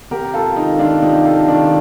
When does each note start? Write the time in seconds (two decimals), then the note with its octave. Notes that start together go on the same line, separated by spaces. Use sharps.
0.11 C3 G4 A#4
0.34 F4 A4
0.56 D#3 D#4
0.79 D4 F4
1.02 C3 D#4 G4
1.25 F4 A4
1.47 D#3 D4 F4